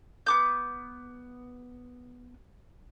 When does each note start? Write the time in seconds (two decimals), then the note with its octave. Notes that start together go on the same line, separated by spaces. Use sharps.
0.26 B3 D6 G6